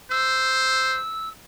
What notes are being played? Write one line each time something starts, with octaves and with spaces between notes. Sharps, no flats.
C5 E6